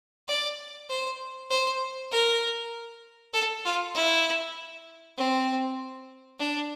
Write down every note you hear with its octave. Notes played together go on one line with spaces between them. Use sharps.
D5
C5
C5
A#4
A4
F4
E4
C4
D4